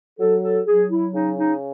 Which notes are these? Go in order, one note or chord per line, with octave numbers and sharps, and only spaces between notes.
F#3 A4
A4
F#3 G#4
E4
C#3 D#4
D#4